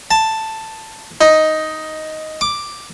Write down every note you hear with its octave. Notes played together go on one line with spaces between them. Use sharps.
A5
D#4
D6